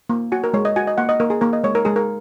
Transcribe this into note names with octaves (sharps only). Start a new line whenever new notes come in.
A#3
F#4 G#5
A#4
G#3 C#5
D#5
F#4 G#5
D#5
A#3 F#5
D#5
A#3 A#4
G#4
A#3 A#4
D#5
G#3 C#5
A#4
G#3 G#4
A#4